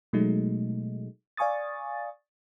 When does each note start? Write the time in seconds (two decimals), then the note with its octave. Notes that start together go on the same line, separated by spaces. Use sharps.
0.13 B2 F#3 G#3 A3 D#4
1.37 D5 F5 G#5 C#6 D#6 A6